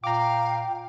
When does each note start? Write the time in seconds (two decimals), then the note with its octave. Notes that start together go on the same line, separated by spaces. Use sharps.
0.04 A#2 F5 G5 A#5 D6